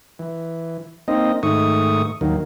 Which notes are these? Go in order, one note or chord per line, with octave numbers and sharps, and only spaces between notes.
E3
A#3 C4 D#4 D#5
G#2 D#3 A3 C#6 D#6
D#2 D#3 F#3 A#3